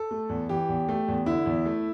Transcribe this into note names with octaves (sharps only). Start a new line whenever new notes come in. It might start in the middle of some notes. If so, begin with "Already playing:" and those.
Already playing: A4
A3
E2
E3 G4
E2
A3
E2
D3 E4
E2
A3